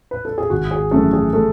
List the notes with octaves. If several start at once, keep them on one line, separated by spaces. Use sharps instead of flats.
B4
A4
G#4
G#1 F#4
G#4
F#2 E3 A3 C#4 A4
G#4
A3 A4